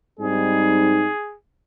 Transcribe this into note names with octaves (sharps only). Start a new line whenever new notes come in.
G#2 G3 C4 D#4 G#4